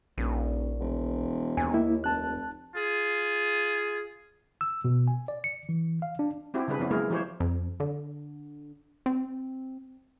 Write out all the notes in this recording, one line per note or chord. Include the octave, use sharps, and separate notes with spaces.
D#1 A#1
E1
D#2 G#5
A#3 E4
F1 A5 F#6
F4 G#4
E6
B2
G#5
D5
C#7
E3
F5
D4
C4 E4 F#4 G4
C#3 G3 D4 G#4 B4
F3 B3 C#4 E4
F#3 G#3 A#3 E4 G#4 A#4
E3 F3 G4 C5 C#5
F2
D3
C4